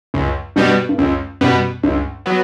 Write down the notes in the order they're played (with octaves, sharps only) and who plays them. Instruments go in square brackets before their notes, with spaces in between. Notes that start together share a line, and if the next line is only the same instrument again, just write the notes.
[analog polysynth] C#2 [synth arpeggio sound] F#2
[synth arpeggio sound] G2 [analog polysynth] B2 G3 B3
[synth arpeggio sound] G2
[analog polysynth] C#2 [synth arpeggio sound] F#2
[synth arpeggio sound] F#2 [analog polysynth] B2 G3 B3
[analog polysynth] C#2 [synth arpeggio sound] G2
[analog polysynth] F#3 B3